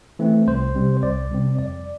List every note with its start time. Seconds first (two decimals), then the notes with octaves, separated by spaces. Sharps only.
0.19 E3 A3 C4
0.47 C2 C5
0.75 C3 G3 C4
0.97 C5
1.03 C2 D5
1.31 C3 G3 C4
1.59 F2 D5